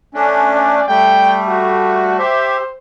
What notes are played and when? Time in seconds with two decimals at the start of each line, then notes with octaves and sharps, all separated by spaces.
0.14 A3 C#4 D4
0.55 D5
0.88 G3 A3 G5
1.47 F#4
2.19 G4 C5 E5